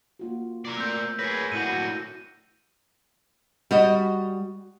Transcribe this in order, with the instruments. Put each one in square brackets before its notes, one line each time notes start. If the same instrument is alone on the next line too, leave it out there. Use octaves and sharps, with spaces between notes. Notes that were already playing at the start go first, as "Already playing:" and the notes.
[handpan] A#3 F4 F#4
[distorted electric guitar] A#4 D5
[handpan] A3 C4 [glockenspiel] E6 G6
[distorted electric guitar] G#4 B4 [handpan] A#4 C#5 [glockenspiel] G6 A#6
[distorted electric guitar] A2 F#4 [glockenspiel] G6 C#7 D#7
[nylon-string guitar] G3 F#4 D#5